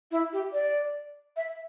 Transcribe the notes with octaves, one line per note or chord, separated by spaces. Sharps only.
E4
G4
D5
E5